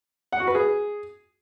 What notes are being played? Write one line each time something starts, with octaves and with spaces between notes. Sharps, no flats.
F#5
F#4
B4
G#4